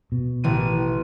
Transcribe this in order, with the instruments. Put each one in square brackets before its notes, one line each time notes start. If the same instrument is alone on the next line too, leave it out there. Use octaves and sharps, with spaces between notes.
[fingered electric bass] B2
[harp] A1 E3 D#7